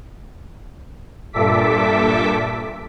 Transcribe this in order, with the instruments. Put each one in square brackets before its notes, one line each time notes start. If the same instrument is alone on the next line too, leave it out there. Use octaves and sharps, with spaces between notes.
[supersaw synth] G2 A#2 A4 E5 D6 B6